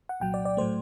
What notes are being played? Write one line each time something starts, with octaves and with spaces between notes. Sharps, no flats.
F#5
C2 A#2 F#3 G5
D5
D5
A2 F#3 A3 C5